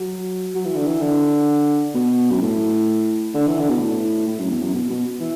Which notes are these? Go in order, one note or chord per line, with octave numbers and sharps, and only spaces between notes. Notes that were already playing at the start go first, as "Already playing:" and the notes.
Already playing: F#3
F#3
E3
D3
E3
D3
B2
F#2
A2
D3
E3
D3
B2
A2
A2
F#2
E2
F#2
B2
B2
E3